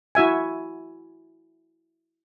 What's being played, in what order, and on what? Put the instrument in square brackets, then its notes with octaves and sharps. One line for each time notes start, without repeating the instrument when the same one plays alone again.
[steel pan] E4 F#4 E5 G#5